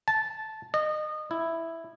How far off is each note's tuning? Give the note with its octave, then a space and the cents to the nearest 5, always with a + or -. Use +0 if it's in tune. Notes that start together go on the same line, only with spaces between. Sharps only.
A5 -10
D#5 -25
E4 +0